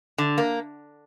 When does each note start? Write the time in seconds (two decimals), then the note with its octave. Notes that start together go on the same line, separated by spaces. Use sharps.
0.18 D3
0.38 A#3